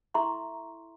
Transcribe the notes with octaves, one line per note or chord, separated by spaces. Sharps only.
E4 A4 E5 A#5 C6 C#6